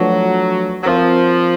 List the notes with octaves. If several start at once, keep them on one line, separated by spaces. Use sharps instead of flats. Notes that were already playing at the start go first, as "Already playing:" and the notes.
Already playing: F3 F#3 A3 D4 F#4 B4
F#3
F3 C4 F4 A#4